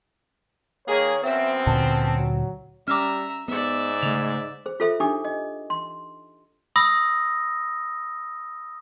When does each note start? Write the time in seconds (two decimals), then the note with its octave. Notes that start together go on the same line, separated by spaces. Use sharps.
0.88 D#3 A#3 G#4 C#5
1.24 F#2 B3 C4 E5
1.67 D2 A#2 D3 A5
2.12 F#3
2.88 G3 C#4 E5 A#5 D6 E6 F6
3.48 G#2 B3 D5 E5
4.02 C#3 A3 F7
4.66 G#4 C5
4.80 F4 G#4 A4 C5 E5
5.00 D4 D#4 G4 G#5 D6 D#6
5.25 D#5
5.70 C6
6.76 B5 D#6 E6 A#6